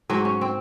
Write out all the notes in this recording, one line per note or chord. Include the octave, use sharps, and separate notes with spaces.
G#2 F#3 C#4
C#4
C4